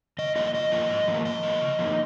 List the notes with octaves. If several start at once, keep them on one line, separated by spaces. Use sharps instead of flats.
C#3 D#5
F3 A#3 F4 D#5
C#3 D#5
F3 A#3 F4
G#2
F3 A#3
G#2 D#5
F3 A#3
C#3
F3 A#3 D#4